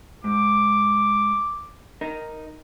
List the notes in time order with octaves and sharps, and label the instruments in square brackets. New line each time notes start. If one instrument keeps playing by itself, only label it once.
[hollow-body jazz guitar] G#2 [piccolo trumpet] D6
[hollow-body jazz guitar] D#4 A#4